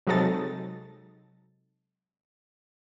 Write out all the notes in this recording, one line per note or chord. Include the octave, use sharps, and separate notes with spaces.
C3 F#3 G#3 D#4 A4 A6